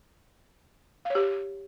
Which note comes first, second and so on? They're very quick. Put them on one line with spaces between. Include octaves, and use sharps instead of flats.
F5 C#5 G4